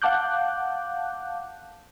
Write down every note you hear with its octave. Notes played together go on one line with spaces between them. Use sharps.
F5 F#5 A5 D6 F#6 G6